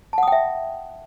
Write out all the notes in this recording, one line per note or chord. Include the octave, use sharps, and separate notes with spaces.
E5 F#5 G5 A5 D#6